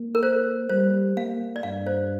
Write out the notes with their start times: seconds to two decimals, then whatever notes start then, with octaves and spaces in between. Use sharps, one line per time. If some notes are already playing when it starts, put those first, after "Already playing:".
Already playing: A#3
0.15 A#4
0.23 C5
0.69 G3 C5
1.17 A#3 F5
1.56 D5
1.63 G2 F5
1.87 C5